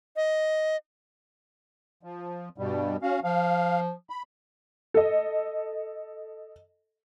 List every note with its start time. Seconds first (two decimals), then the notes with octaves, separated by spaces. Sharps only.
0.16 D#5
2.03 F3
2.58 G2 B2 G3
3.02 C#4 F#4 F5
3.24 F3 F5
4.10 B5
4.94 A4 D#5